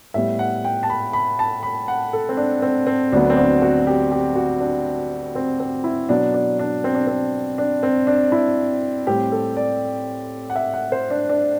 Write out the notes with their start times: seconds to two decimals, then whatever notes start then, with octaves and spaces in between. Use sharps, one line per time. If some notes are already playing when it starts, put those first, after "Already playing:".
0.14 A2 G3 B3 E5
0.39 F#5
0.64 G5
0.83 A5
0.90 B5
1.13 B5
1.39 A5
1.63 B5
1.88 F#5
2.13 A4
2.29 C4
2.37 D4
2.62 C4
2.87 C4
3.12 D2 D3 F#3 B3 D4
3.30 C4
3.37 D4
3.62 F#4
3.87 G4
4.11 G4
4.35 F#4
4.60 D4
5.35 C4
5.60 C4
5.84 E4
6.09 B2 F#3 B3 D4
6.34 D4
6.59 D4
6.84 C4
6.95 D4
7.07 C4
7.58 D4
7.83 C4
8.07 D4
8.32 E4
9.07 A2 G3 C4 G4
9.32 A4
9.57 D5
10.50 F#5
10.56 E5
10.73 F#5
10.92 C5
11.10 D4
11.29 D4